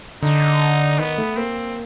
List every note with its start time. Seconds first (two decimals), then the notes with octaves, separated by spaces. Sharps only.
0.23 D3 D#4
0.98 D#3 B3
1.18 A3
1.37 A#3 C4